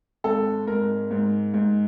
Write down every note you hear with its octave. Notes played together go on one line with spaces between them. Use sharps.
G#1 A4
G#2 A#4
G#2
G#2